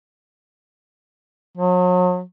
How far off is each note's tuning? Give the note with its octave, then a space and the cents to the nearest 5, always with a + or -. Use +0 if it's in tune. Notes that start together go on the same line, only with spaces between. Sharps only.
F#3 -40